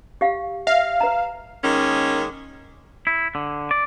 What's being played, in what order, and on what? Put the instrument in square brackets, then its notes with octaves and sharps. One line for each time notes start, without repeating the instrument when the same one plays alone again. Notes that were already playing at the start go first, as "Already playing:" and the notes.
[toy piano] G4 F5
[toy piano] E5 [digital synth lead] F5
[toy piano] B4 A#5
[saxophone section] D#3 G#3 A#3 C#4
[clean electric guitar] E4
D3
D5